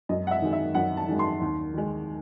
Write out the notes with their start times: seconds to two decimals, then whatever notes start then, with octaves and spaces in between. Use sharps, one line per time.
0.09 F#2 D#5
0.27 F#5
0.31 E5
0.42 D#3 G#3
0.53 E5
0.75 F#2 F#5
0.97 A5
1.08 D#3 G#3
1.19 C6
1.41 D#2
1.74 D#3 G#3